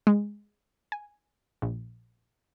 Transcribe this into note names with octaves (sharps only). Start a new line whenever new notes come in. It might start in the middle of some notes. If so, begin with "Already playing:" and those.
G#3
G#5
A#1